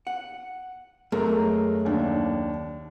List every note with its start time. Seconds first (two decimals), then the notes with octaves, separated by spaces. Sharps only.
0.07 F#5
1.12 F#2 G#3 A3 A#4
1.85 D#2 D4